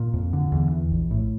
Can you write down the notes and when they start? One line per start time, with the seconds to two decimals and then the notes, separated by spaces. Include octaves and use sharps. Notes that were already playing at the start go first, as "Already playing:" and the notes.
Already playing: A#2
0.14 F2
0.33 D3
0.52 E2
0.72 E3
0.92 A#1
1.11 A2